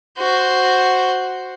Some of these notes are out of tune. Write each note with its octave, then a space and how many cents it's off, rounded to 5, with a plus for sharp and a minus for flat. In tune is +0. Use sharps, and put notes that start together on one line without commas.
F#4 +0 C5 +0